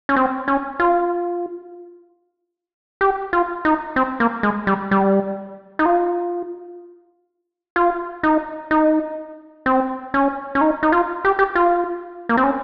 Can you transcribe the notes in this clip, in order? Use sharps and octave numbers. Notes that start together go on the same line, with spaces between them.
C#4
C4
C#4
F4
G4
F4
D#4
C4
A#3
G#3
G3
G3
D#4
F4
F4
D#4
D#4
C4
C#4
C#4
D#4
D#4
F4
G4
G4
F4
A#3
C4
C#4